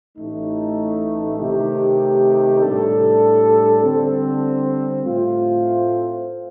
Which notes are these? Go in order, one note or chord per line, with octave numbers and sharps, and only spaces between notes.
A1 A2 A3 D#4
C3 D#3 A3 D#4 G4
A2 G3 D4 A4
D3 G3 C4
A2 A3 C4 F4 C5